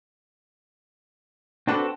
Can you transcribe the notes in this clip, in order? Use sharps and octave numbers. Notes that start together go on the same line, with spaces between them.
C4 D4 F#4 A4 B4